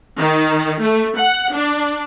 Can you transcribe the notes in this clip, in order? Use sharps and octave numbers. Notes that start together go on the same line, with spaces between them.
D#3
A3
F#5
D4